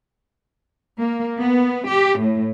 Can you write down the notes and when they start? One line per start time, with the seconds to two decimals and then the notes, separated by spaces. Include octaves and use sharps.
1.00 A#3
1.38 B3
1.87 G4
2.19 A2